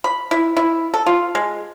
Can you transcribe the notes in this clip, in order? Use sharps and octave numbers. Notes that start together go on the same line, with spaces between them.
B5
E4
E4
A4
F4
G#3